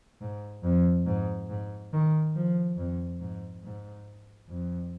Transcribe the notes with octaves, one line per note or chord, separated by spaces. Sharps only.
G#2
F2
G#2
G#2
D#3
F3
F2
G#2
G#2
F2